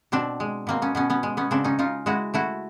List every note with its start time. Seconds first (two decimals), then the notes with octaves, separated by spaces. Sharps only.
0.12 B2 C4 D4
0.40 G#3
0.67 B2 A#3 C4
0.82 B3 C#4
0.95 B2 B3 C#4
1.10 B3 C#4
1.23 G#3
1.37 B3 C#4
1.51 C#3 C4 D4
1.64 C#4 D#4
1.79 C#3 D#4 F4
2.06 G#3 E4 F#4
2.34 A3 E4 F#4